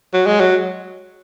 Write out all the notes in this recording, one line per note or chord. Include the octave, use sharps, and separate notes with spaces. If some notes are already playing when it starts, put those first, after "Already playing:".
F#3
G#3
F#3